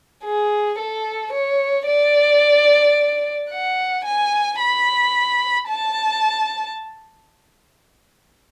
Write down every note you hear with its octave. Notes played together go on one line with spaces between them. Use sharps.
G#4
A4
C#5
D5
F#5
G#5
B5
A5